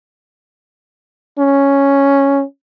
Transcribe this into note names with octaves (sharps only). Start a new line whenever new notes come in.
C#4